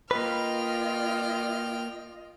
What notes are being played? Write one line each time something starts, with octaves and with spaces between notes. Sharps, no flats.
A#3 F4 B4 D#5 G5 F6